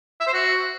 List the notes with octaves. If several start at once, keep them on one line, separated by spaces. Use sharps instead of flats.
E5
C5
F#4